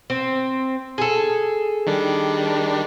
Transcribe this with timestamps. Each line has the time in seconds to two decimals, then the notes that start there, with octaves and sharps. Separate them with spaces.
0.10 C4
0.98 G#4 A4
1.87 D#3 G3 D4